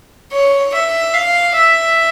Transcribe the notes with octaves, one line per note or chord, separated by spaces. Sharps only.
C#5
E5
F5
E5